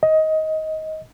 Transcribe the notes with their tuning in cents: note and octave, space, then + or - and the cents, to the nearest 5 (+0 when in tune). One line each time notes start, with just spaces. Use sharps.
D#5 +15